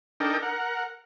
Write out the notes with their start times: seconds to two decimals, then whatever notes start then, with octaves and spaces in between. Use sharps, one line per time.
0.20 D4 D#4 A4 A#4 G5
0.43 A#4 F#5